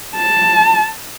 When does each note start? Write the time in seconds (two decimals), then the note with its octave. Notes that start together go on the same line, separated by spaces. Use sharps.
0.17 A5